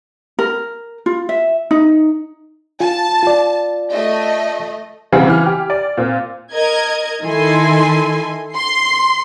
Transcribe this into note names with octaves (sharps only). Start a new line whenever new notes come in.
A#4
F4
E5
D#4
F4 A5
F4 D5
A3 D#5
B1 C#3 E3 G3 C4 F#5
E3 F6
G4
D5
A#2 C4
A#4 D#5 G#6
D#3 E4 A4 G#5 C6
C6 C7